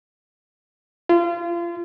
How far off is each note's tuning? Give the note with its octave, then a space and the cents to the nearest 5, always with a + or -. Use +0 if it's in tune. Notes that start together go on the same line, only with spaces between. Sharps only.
F4 -30